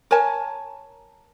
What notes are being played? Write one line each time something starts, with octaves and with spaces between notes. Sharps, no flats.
A#4 C#5 G#5 A5